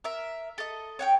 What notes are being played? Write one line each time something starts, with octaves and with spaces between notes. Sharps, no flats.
A#4 E5
A4 D#5
C#5 F#5 G5